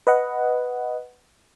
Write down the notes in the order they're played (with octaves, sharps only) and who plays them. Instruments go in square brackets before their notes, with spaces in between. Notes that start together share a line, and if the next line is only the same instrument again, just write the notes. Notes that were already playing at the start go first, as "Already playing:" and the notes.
[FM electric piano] B4 D#5 F#5